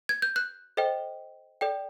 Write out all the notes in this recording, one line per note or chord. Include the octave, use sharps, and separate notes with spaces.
G#6
G6
F#6
A4 C5 D#5 G5
A4 D5 G5